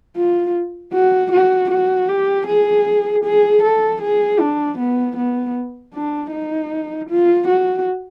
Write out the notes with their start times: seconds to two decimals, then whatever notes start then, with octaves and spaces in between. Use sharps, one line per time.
0.17 F4
0.93 F#4
1.32 F#4
1.71 F#4
2.09 G4
2.47 G#4
3.24 G#4
3.63 A4
4.02 G#4
4.40 D4
4.78 B3
5.17 B3
5.94 D4
6.32 D#4
7.10 F4
7.48 F#4